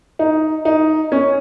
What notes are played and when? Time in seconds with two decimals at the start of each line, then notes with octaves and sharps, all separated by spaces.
0.19 D#4
0.65 D#4
1.12 C#4